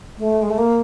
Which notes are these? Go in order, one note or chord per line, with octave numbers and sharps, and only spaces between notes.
A3
G#3
A3
A#3